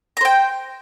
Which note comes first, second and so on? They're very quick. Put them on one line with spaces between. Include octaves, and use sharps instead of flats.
A#5 C5 G5